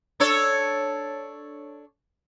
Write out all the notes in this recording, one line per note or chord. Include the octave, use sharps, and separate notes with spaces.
D4 A4 C#5